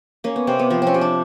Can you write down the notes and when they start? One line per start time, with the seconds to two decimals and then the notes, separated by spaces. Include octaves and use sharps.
0.24 A#3 C#4
0.36 B3
0.47 C3 C4
0.59 B3
0.70 F3 C4
0.82 C4 C#4
0.94 C3
1.01 D4